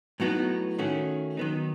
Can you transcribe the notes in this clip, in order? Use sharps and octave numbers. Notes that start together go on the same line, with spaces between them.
A2 F#3 B3 D#4 F#4
D#3 A3 C#4 F#4
D#3 F#3 B3 D#4